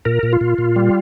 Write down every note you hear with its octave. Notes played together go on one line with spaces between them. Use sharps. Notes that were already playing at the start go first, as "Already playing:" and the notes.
A#2 A#4
A#2
F4
A#2
A#2
G3